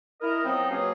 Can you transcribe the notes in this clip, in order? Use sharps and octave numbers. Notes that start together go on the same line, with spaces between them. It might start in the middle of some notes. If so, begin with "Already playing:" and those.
E4 A#4 D#5
F3 F#3 B3 C4 D#4
B2 F#3 A#3 C#4 F4 G#4